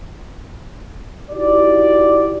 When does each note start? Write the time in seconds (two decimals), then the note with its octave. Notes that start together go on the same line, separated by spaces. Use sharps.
1.30 D#4 E4 F#4 G4 D5